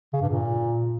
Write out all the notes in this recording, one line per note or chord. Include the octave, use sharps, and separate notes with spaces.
C#3
G2
A#2